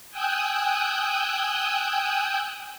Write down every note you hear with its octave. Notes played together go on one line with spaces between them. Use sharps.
G5 G#5 D#6 E6 F#6 G6